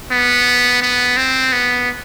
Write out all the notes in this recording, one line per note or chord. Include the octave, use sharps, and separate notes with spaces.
B3
B3
C4
B3